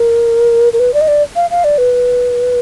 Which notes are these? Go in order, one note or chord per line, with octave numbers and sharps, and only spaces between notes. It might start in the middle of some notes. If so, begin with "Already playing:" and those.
Already playing: A#4
A#4
B4
D5
D#5
D5
F5
F5
D5
B4